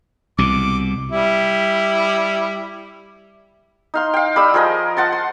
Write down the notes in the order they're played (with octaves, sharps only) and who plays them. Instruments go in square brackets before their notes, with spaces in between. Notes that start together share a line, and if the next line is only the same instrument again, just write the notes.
[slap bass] C2 B2 [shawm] D6
[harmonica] G3 E4
[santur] D#4 F5 C6
F5 G5
G3 B5 D#6 E6
F3 G#4 A#4 D#5
C5 F#5 A5 C6
C6